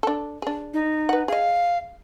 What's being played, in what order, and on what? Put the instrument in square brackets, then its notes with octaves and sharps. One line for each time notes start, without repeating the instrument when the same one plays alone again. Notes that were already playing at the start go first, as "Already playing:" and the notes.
[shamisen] D4 A4
D4 G#4
[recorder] D#4
[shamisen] B4 F#5
[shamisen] G#4 D#5 [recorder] F5